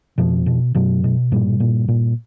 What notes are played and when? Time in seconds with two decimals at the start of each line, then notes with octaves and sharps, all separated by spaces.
0.18 F2 B2 F3
0.46 B2
0.75 F#2 B2 F#3
1.04 B2
1.32 G2 A#2 G3
1.60 A#2
1.88 A#2